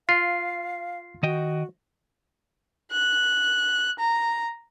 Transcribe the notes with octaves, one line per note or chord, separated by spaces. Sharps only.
F4 F5 C7
D#3 F#4 D#5 G5
F#6
A#5